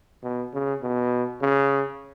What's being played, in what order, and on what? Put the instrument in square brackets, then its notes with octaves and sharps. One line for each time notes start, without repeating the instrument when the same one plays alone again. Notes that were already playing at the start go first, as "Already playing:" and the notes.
[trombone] B2
C#3
B2
C#3